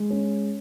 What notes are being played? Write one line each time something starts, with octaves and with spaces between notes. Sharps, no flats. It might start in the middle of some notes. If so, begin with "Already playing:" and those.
Already playing: G#3
C#4